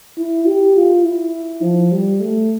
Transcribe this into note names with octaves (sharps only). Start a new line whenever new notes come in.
E4
G4
F4
E4
F3
G3
A3